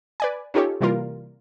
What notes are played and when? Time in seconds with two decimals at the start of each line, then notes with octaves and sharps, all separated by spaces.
0.20 B4 D5 G#5
0.54 C#4 D#4 F4 G4 A4 C#5
0.81 C3 E3 G3 A#3 F4 A#4